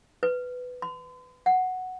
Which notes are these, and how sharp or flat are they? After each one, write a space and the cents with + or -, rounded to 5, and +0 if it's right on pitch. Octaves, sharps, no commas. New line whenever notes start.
B4 +10
C6 -45
F#5 +0